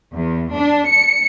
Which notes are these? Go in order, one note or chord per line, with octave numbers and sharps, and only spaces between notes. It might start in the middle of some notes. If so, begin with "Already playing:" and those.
E2
D4
C#7